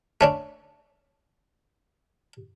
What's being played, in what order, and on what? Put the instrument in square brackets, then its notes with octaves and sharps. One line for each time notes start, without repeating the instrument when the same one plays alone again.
[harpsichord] A3 C#4 D4